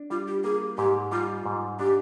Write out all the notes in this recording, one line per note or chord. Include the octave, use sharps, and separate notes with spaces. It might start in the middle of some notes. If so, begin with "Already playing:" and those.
Already playing: D4
G3 F4
G4
A#3 G#4
G#2 G4
G3 F4
G#2
D4 G4